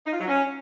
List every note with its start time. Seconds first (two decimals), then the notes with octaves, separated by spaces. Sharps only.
0.06 D#4
0.13 F4
0.20 F#3
0.27 C#4